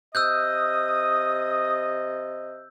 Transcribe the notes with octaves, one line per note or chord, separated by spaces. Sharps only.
C3 D#5 D#6 E6 F#6 G6